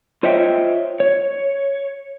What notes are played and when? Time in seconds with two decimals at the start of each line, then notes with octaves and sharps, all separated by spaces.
0.23 F4 C5 C#5 D#5 E5 G5
1.00 C#5